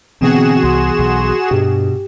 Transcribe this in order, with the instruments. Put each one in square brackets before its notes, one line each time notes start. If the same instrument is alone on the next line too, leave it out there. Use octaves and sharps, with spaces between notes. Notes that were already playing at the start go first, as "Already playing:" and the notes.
[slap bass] B2 D3 [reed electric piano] E3 B3 [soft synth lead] C4 [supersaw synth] F#4 G#4 E7
[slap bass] C2 [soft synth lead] C6
[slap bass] B1 [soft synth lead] C6
[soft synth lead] G2 [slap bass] B2 [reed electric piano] G4